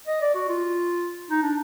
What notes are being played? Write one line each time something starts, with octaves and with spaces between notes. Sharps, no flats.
D#5
D5
F#4
F4
D#4
D4